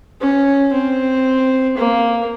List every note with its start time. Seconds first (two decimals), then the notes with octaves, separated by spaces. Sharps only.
0.21 C#4
0.73 C4
1.77 A#3